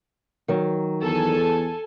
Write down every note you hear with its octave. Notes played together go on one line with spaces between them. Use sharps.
D#3 F#3
E2 A4 G#5